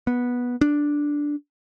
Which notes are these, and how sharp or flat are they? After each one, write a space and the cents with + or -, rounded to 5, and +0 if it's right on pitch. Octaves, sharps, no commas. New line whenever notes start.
B3 -10
D4 -5